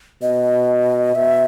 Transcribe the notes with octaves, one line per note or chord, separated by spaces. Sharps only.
B2 D#5
B2 E5